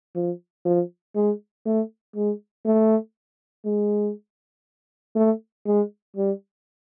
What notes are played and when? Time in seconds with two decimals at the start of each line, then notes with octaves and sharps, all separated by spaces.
0.15 F3
0.65 F3
1.15 G#3
1.65 A3
2.16 G#3
2.66 A3
3.65 G#3
5.16 A3
5.66 G#3
6.16 G3